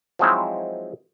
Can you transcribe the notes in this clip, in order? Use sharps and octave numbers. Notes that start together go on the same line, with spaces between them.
F3 F#3 G#3 C4 D#4 E4